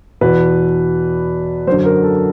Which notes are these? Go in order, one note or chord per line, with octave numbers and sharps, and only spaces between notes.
E2 B2 B4
F#2 D3 C5
A#4
A4